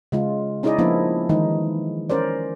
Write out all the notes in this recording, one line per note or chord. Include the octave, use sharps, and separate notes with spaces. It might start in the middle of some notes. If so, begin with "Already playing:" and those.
C#3 G#3 F4
C#4 D#4 E4 G#4 D5 D#5
F3 A#3 B3 D4 E4
D#3 E3 G#3 D#4
C#4 A#4 C5 D5